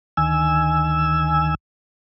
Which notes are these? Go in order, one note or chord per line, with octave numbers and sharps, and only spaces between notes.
D2 D#3 G#5 E6